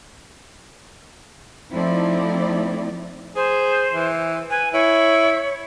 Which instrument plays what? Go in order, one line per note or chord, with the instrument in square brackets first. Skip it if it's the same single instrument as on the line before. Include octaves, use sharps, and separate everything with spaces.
[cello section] F3 A3 C4 D#4 E4 D5
[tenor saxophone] G#4 [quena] C5
[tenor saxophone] E3
[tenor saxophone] B4 [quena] G#5
[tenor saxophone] E4 [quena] C#5